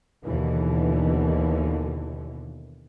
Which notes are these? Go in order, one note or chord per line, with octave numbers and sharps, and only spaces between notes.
D#2 B2 D3 E3